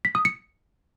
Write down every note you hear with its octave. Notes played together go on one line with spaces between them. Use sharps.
B6
D#6
C#7